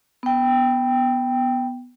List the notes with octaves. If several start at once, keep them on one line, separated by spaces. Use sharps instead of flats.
B3 G5